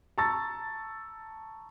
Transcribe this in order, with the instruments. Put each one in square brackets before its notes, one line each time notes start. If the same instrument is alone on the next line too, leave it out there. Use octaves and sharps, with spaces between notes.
[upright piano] A5 A#5 C#6 E6 A6